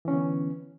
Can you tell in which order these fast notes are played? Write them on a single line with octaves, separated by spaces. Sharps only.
E3 C#4 D3 B3